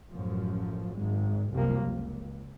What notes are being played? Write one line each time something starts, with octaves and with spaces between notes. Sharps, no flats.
A1 F#2 F3
G#1 G#3
C2 F#2 C3 F3 G3 A#3
C#2